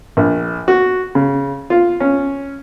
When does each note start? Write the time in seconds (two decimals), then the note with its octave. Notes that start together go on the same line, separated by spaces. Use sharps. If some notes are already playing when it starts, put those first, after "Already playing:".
0.17 A#1
0.68 F#4
1.15 C#3
1.70 F4
2.00 C#4